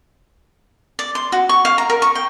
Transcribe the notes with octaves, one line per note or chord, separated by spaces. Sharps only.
D5
C6
F#4
C#6
F5
A#5
A#4
C#6
G5